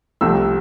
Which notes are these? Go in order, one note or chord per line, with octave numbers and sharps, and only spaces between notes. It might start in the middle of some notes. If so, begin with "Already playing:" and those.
C2 C3 F3 A3 E6